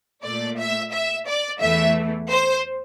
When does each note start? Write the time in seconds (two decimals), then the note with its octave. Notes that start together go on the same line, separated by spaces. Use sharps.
0.24 A#2 A3 D5
0.58 E5
0.92 E5
1.27 D5
1.61 E2 E3 A3 E5
2.30 C5